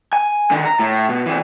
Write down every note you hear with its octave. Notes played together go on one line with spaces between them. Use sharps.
G#5
D3 D#3
A#5
A2
B2
E3 C4